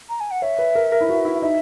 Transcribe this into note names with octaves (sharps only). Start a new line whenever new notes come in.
A#5
G#5
F#5
C#5 E5
B4
A#4
A#4
E4
F#4
E4
D#4 E5